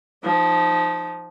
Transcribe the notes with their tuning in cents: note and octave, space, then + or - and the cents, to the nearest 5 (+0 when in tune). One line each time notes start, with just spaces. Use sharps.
F3 +0 D#4 +0